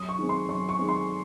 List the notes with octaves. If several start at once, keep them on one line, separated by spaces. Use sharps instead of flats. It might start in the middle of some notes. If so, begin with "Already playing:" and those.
Already playing: F#2 D#6
C#6
D#3 G#3 C4
C6
F#2 C#6
C#6
D#3 G#3 C4
C6